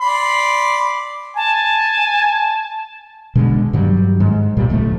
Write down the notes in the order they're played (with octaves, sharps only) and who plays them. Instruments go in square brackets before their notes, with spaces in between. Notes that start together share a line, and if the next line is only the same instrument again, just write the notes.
[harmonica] D5 B5 C6
[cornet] G#5 [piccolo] A5
[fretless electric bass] B2 D3 G#3
G2 D#3 F#3 G3
G#2
B1 A#2 G3
D#1 D2 F3 A3